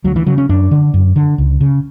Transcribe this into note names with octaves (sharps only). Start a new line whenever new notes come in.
D2 F#3
E3
C#3 F#3
C#4
F#2 D4
D3
F#2
D3
C#2
C#3